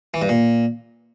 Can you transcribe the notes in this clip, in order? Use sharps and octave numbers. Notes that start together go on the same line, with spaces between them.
E3
G2
A#2